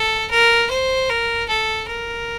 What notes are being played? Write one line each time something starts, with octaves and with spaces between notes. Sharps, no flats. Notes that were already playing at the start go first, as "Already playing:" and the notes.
Already playing: A4
A#4
C5
A#4
A4
A#4